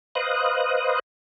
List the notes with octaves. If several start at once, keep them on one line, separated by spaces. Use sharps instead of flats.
B4 C5 D#5 F5 D#6 F#6